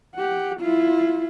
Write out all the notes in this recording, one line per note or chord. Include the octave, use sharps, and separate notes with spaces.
G4 F#5
E4 F4